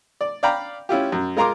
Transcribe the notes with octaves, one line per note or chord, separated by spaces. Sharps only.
D5
D5 F5 G5 A#5 B5
C#4 E4 F4 G4
F#2
G#3 F4 A#4 A#5 C6 D6